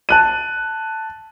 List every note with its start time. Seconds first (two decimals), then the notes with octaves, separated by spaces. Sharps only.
0.09 A5 F#6 D#7